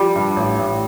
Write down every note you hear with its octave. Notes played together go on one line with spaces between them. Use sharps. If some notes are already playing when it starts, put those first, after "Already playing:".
Already playing: F3 G3
G2
A1
A1